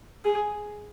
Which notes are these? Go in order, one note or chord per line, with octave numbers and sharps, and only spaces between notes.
G#4